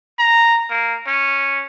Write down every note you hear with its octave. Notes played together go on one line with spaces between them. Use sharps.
A#5
A#3
C#4